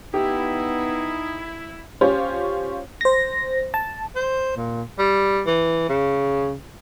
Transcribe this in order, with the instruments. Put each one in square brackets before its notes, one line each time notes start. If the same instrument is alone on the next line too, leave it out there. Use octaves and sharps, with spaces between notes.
[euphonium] B3 [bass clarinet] D#4 [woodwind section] E4 [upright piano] G4
[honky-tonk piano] C#4 F4 G4 C5 C#5
[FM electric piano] C5 A#6
A5
[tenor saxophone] C5
A#2
G3
E3
C#3